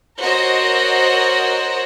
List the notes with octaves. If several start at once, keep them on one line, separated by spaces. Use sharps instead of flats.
F#4 A#4 C5 C#5 D#5